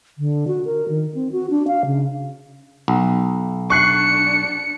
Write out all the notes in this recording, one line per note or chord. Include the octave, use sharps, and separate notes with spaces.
D3
F#4
A#4
D#3
C4
F#4
D4
F5
C#3
B1
D4 C#6 F#6 C7 C#7